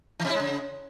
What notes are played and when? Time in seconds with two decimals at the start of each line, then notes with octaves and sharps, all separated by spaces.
0.20 E3
0.25 C3
0.30 E4
0.35 G#3
0.40 C#3